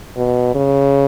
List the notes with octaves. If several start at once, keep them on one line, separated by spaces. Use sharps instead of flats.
B2
C#3